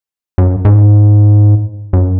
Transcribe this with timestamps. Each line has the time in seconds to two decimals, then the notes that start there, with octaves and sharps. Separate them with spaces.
0.38 F#2
0.65 G#2
1.93 F#2